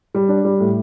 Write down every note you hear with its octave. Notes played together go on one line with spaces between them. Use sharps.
G3
D4
G3
A2